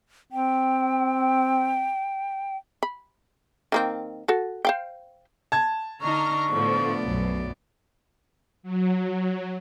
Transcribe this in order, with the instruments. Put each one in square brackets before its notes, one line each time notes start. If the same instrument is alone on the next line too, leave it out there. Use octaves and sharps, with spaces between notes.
[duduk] C4 [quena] G5
[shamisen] B5
D#3 A#3 C4
F#4 A4
C5 F5 G5
[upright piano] A5 G#6
[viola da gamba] D3 D4 D#4 [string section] A#5 F6 [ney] C#6
[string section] A2 D3 F3 [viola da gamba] A3 B3 D5
[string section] B1 F#2
[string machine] F#3